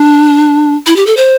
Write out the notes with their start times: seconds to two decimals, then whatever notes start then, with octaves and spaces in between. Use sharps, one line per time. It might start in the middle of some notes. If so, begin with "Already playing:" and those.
Already playing: D4
0.87 E4
0.96 G4
1.07 A4
1.17 C5